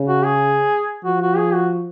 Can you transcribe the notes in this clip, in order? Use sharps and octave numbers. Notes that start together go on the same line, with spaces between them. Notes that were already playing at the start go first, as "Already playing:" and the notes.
Already playing: C#3
F#4
G#4
F3 F#4
F#4
G#4
F#4